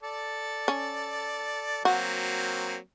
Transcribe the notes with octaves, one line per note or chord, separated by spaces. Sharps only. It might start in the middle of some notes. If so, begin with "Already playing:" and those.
A4 D5
C#4
F#3 A#3 C4 F#4